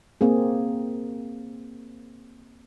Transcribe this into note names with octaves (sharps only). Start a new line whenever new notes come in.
A#3 C4 G#4